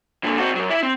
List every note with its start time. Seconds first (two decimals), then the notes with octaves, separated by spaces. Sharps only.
0.24 A#2 D3
0.38 C4 F#4
0.55 F#2 F#3
0.70 E4 E5
0.83 C4